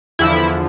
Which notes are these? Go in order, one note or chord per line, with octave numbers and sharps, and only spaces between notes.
E2 D3 F3 E4